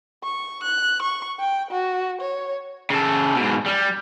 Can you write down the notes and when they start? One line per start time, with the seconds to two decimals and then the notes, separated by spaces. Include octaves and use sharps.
0.23 C#6
0.63 F#6
1.02 C#6
1.40 G5
1.71 F#4
2.21 C#5
2.90 C#3 A4
3.36 G#2 B2
3.66 G3